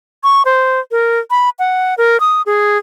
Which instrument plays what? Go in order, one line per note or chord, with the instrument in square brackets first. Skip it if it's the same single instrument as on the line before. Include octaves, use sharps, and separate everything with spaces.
[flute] C#6
C5
A#4
B5
F#5
A#4
D#6
G#4